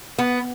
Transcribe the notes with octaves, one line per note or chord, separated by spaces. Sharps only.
B3